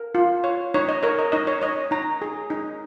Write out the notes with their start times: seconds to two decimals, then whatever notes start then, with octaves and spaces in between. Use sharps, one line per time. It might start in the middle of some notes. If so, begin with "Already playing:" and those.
Already playing: A#4
0.15 F4
0.44 C#5
0.74 D#4 C#5
0.89 D#5
1.03 A#4 C#5
1.19 D#5
1.32 D#4 D#5
1.47 C#5
1.61 C#5 D#5
1.91 D#4 A#5
2.22 G#4
2.50 D#4